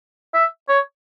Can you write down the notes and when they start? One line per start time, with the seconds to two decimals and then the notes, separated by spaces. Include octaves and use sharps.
0.34 E5
0.69 C#5